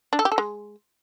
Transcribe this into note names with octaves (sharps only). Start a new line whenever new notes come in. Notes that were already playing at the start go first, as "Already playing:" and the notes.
D4
A4
G4
A4
G#3